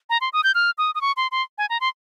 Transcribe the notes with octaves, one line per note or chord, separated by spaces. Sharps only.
A#5
C6
D#6
G6
F6
D#6
D#6
C#6
C6
C6
G#5
A#5
C6